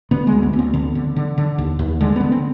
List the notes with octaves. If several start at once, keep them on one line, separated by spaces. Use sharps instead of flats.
D3 B3
D2 G#3
B3
D2
C4
D3 B3
D3
D3
D3
D#2
D#2
D3 G#3
D3 B3
C4